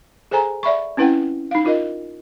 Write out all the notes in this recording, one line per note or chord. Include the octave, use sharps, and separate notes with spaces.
G#4 A4 C5 G#5 A#5
D5 E5 B5 C#6
C4 C#4 E4 B4 F#5 G5
D#4 F5
D#4 F4 A#4 D#5